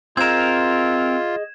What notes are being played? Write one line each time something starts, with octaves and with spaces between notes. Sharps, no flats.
C4 F4 G#4 A#4 D#5 G#6 E7